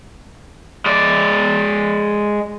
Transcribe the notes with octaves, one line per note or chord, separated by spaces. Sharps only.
G#3 D5